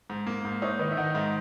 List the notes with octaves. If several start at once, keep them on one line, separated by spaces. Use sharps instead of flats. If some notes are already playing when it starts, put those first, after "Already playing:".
G#2
A#3
G#2
D#4 C#5 E5
D#3 B4 D#5
E5
D#3 D#5 F#5
G#2